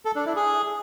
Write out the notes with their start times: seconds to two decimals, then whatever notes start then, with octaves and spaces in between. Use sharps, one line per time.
0.05 A4
0.15 D4
0.26 E4
0.36 G#4